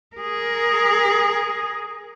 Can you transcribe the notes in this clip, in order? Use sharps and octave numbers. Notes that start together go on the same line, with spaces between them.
G#4 A#4